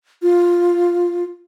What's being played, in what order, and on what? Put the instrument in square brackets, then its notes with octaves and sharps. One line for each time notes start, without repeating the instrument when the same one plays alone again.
[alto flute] F4